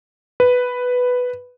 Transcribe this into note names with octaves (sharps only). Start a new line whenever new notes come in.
B4